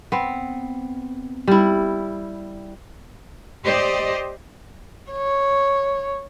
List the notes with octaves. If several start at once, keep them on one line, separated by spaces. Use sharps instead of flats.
B3 C4
G3 E4
G4 C5 D5 D#5
C#5